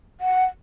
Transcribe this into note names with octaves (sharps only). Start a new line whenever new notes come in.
F#5